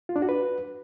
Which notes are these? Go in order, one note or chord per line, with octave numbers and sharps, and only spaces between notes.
F4
D4
F#4
B4